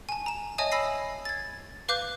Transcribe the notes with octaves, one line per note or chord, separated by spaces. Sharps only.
G#5 A5
A#5 E7
C#5 D#5 E5 G#5 A5 D#6
G#5 B5 E6 A#6 C7
G#6 A6
B4 F5 D6 F#6 G6